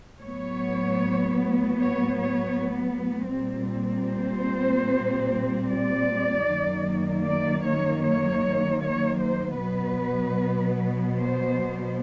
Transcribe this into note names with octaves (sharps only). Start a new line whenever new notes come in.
A2 F#3 B3 C#5
C#5
C#5
A#2 G3 C4
C5
D5
F#2 D#3 F#3 A#3
D5
C#5
C#5
C#5
C5
B2 F#3 B3 B4
C5